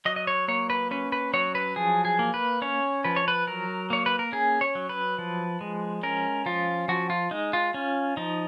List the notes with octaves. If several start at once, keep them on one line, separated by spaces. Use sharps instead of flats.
F#3 D#5
D#5
C#5
A#3 C#5
B4
C#4 B4
B4
F#3 C#5
B4
F3 G#4
G#4
A#3
B4
C#4 C#5
F3 B4
C#5
B4
F#3 A#4
A#3 C#5
B4
A#4
C#4 G#4
C#5
F#3
B4
F3
G#3
C#4 A#4
F3 F4
F3 F#4
F4
G#3 D#4
F4
C#4 F4
F3 D#4